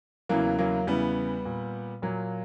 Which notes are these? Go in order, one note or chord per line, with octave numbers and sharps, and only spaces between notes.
E2 C#3 E3 F#3 A#3
F#3 A#3
E2 C#3 E3 G3 B3
A#2
A#2 F#3 A#3